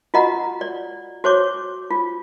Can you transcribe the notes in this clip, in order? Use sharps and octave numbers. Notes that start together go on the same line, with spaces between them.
F4 F#4 D#5 F#5 A#5
D5
F#4 C5 C#5 D6
F4